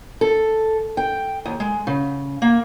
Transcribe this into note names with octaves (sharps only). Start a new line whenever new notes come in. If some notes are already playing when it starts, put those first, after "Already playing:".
A4
G5
D#2
G#3
C#3
A#3